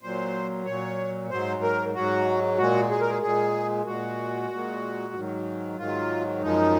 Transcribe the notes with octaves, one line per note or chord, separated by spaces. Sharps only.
A#2 F#3 C5
A#2 F#3 C#5
G#2 F#3 C5
A#4
G#2 F#3 F#4
A#2 G#3 F#4
G#4
A#4
G#4
A#2 G#3 G#4
A#2 G#3 F#4
A#2 G#3
G#2 D#3 F#3
G#2 D#3 F#3 F4
F#2 F3 G#3 D#4